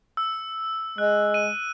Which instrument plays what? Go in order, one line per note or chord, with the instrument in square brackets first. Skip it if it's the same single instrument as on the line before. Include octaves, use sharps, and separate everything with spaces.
[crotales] E6
[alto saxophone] G#3 [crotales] F#6
[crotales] D#7